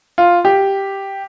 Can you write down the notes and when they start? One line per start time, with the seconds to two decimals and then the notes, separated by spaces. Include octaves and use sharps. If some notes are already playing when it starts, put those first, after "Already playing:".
0.18 F4
0.45 G4